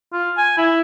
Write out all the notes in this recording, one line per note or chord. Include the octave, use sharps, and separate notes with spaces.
F4
G#5
E4